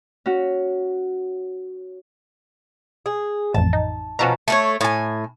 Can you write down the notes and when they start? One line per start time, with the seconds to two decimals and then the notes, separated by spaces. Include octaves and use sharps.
0.26 C#4 F#4
3.06 G#4
3.54 A1 F2 A5
3.73 D#4
4.19 B2 F3 C#4 F#4 A5 A#5
4.48 A3 A#4 C#5
4.81 A2 G#5